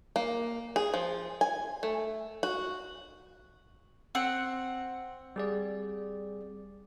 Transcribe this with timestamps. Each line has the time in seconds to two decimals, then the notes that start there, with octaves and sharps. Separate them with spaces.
0.16 A#3
0.76 G#4
0.94 F3
1.41 G#5
1.83 A3
2.43 F#4
4.15 C4 F#5
5.36 G3 G#4 D5